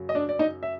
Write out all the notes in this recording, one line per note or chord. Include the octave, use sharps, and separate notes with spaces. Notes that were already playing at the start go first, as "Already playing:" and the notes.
Already playing: F#2 C#3 F#3
D#5
D4 D5
D5
D#4 D#5
E5